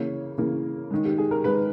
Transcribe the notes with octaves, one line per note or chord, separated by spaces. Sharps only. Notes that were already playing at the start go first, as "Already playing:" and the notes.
Already playing: C#3 E3 A#3 C#5
C#3 E3 A#3
D#3 G#3
G4
G#4
A#4
D#3 G#3 B4